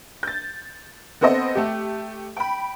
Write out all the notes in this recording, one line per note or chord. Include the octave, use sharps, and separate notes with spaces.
G6 A6
B3 C4 A4 C5 D#5 F#5
A3 G4
G5 B5